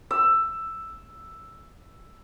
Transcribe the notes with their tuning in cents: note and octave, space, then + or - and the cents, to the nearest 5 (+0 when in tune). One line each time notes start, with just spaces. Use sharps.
E6 +5